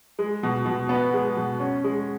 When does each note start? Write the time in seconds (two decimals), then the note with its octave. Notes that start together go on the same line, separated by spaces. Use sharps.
0.19 G#3
0.43 B2
0.66 B2
0.89 B3
1.14 G#3
1.36 B2
1.60 C#4
1.84 G#3